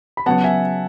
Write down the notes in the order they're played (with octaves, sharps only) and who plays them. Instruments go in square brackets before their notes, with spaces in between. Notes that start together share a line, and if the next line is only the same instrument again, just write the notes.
[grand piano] B5
[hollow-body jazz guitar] C#3 F#3 B3 [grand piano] F#5 A5
[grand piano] E5 G#5